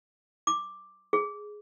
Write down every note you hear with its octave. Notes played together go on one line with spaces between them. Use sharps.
D6
G#4